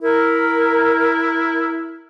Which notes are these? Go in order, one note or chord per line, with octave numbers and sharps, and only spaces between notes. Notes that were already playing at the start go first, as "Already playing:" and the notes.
E4 A#4